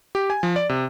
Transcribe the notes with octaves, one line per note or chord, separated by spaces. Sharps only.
G4
G#5
F3
D5
C3